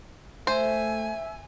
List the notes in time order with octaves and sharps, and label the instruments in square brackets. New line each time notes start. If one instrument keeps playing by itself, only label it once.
[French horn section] A3 [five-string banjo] C5 [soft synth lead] E5 [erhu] G#5